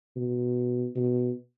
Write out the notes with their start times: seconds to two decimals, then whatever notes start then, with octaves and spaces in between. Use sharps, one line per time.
0.16 B2
0.96 B2